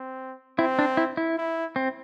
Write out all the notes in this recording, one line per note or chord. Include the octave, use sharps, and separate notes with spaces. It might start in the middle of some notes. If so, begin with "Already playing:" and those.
Already playing: C4
C4 E4
D4
E4
E4
E4
C4